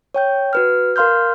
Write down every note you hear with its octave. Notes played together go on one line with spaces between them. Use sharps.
C#5 G5 G6
F#4 B4 F6
A#4 F5 C6 F6 G6